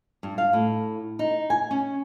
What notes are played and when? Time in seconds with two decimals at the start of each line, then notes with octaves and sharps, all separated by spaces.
0.23 G2
0.38 F5
0.53 A2
1.19 D#4
1.50 G#5
1.71 C#4